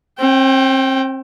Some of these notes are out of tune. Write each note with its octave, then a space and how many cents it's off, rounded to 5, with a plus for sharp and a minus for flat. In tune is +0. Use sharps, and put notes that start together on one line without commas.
C4 +35 G5 -15